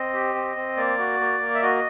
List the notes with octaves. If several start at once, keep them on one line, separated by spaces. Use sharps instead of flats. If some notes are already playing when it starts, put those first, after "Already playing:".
Already playing: C4 D#5
G4
C4
C4
A#3 D5
F#4
A#3
A#3
E5
F#4 D#5